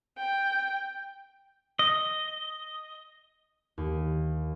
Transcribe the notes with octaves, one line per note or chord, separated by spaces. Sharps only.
G5
D#5
D#2